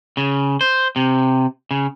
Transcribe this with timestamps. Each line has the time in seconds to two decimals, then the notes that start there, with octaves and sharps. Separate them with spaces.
0.17 C#3
0.61 C5
0.96 C3
1.71 C#3